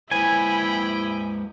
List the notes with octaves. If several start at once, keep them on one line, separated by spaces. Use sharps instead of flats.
G#3 E4 B4 C5 G5 G#5 B5